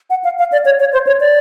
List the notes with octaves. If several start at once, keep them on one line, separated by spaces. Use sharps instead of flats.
F#5
F5
F5
D5
C#5
C#5
C5
C#5
D5